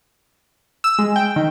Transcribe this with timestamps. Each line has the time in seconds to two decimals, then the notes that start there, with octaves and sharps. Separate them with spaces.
0.84 E6
0.99 G#3
1.16 G5
1.36 D#3